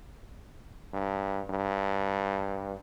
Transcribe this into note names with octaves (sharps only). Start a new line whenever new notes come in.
G2
G2